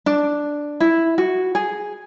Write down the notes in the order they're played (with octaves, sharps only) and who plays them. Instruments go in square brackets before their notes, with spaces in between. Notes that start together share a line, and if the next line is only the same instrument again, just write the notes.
[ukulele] D4
E4
F#4
G#4